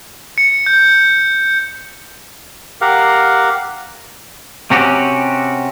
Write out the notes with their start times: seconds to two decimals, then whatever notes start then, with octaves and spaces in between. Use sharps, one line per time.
0.38 C#7
0.66 G6
2.81 G4 A#4 F5 F#5
4.71 C3 C4 C#4 F#4 G4